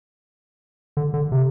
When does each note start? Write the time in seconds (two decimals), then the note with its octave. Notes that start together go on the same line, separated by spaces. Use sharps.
0.97 D3
1.14 D3
1.32 C3